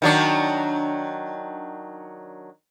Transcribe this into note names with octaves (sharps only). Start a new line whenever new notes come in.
D#3 F#3 D4